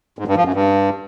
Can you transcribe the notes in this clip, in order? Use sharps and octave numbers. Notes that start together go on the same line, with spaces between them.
G#2
G2
F3
F#2
G2